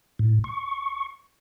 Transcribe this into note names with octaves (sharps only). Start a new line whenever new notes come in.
A2
C#6